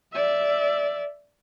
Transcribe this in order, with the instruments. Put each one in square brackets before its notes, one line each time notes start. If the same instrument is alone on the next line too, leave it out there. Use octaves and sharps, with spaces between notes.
[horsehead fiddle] D5 E5